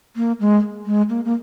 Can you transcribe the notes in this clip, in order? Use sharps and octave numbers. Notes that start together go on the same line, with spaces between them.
A#3
G#3
G#3
A#3
A#3